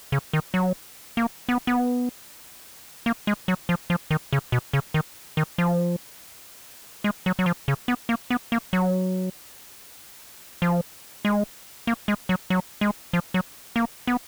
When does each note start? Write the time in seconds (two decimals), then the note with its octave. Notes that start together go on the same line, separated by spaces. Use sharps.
0.12 C#3
0.33 D#3
0.54 F#3
1.17 A#3
1.49 B3
1.67 B3
3.06 A#3
3.27 G#3
3.48 F#3
3.69 F3
3.90 F3
4.11 D#3
4.33 C#3
4.52 B2
4.73 C#3
4.94 D#3
5.37 D#3
5.58 F3
7.04 G#3
7.26 F#3
7.39 F#3
7.46 F3
7.68 C#3
7.88 B3
8.09 A#3
8.30 B3
8.52 A#3
8.73 F#3
10.62 F3
11.25 G#3
11.87 A#3
12.08 G#3
12.29 F#3
12.50 F#3
12.81 G#3
13.13 F3
13.34 F#3
13.76 A#3
14.07 B3